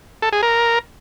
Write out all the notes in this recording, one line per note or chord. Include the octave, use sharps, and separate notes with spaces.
A4
G#4
A#4